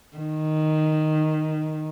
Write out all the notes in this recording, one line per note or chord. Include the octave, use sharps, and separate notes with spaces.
D#3